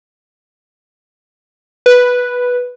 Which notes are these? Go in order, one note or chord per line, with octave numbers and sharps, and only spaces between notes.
B4